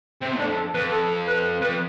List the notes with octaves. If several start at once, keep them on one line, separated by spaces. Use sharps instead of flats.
C3 C4
F2 D4
A4
F2 B4
A4
B4
F2 B4